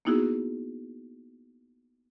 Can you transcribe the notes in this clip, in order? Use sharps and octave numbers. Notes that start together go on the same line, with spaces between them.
A#3 B3 D#4 E4 F#4 G#4